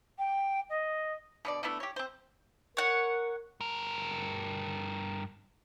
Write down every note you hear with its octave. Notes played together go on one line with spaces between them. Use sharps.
G5
D#5
B2 D3 D5
D3 A3 B3 E4
G4 C#5
C4 C5
A#4 C#5 F#5
G2 A#4